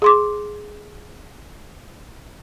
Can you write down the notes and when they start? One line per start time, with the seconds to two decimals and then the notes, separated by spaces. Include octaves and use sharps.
0.02 G#4 C6 D6